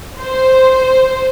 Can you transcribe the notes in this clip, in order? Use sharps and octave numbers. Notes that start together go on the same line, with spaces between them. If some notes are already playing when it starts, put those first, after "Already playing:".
C5